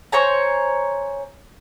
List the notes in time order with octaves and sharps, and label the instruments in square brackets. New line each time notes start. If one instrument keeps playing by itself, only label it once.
[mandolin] C5 C#5 G#5 A#5